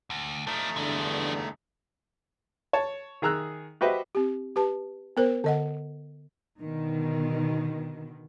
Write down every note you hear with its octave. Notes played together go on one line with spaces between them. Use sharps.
D2
F3 A3 D4 D#4
E2 G2 D3 F3 D#5
C#5 A5
D#3 G#4 A#5 E6 F#6
F#4 G4 B4 C5 D#5 E5
C4 G4
G4 B4 A5
B3 A#4 C5
D3 D#5 F#5
B2 D3 D#3